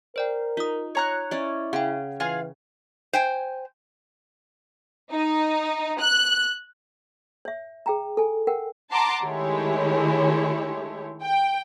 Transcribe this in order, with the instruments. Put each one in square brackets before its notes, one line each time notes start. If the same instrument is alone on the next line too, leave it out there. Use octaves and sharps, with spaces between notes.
[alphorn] A#4 [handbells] C5 D5 G5
[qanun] D#4 [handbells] F4 D#6
[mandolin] C#5 A#5 F#6
[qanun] C#4 D5 [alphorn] E4 [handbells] D#5
[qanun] C#3 [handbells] F#5 G5
[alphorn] E3 [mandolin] F4 G#4 F5
[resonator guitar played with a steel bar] C5 G5 G#5
[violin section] D#4
F#6
[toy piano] C#5 E5
G#4 G5 A#5
A4 G#5
A#4 F#5 G5
[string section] F#5 A5 A#5 C6 D6
D#3 G#3 A3 E4 G4 C#5
G5